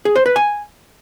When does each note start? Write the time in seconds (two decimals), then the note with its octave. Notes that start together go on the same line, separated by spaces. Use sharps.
0.05 G#4
0.16 C5
0.26 B4
0.36 G#5